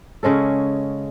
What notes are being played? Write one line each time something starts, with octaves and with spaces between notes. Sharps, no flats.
C#3 G#3 C#4 A4